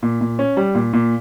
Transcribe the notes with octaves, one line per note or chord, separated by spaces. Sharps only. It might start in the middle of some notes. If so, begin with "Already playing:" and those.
A#2
A#2
C#4
G3
A#2
A#2